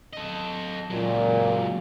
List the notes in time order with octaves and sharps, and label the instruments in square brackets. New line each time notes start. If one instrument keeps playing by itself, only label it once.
[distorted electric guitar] A4 D#5
[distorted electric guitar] C#2 F#3 [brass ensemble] A#2